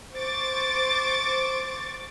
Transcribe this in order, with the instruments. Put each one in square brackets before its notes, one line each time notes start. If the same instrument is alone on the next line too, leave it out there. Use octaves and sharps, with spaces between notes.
[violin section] C5 C#6 D6 A6